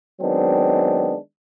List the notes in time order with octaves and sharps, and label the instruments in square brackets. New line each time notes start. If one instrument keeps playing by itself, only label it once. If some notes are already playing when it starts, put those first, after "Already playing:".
[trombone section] D#3 F#3 G#3 B3 C4 D4